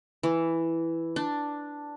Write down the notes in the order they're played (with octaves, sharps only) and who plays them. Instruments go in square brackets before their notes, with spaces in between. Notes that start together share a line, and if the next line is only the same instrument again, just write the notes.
[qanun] E3
D4